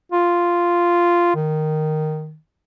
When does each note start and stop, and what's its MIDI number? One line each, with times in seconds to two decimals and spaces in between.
0.12 1.31 65
1.35 2.36 51